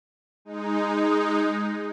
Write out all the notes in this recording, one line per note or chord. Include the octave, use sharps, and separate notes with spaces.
G#3 D#4